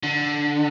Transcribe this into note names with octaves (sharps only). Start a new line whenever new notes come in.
D3